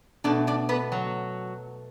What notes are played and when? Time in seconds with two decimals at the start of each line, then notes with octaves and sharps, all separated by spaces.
0.24 B2 A3 D4 D5
0.47 D4 D5
0.69 B3 B4
0.92 F#3 F#4